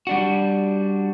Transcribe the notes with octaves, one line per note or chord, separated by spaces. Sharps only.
G3 D4 F#4